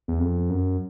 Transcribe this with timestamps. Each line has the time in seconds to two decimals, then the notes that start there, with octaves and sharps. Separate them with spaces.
0.08 E2
0.20 F2
0.50 F#2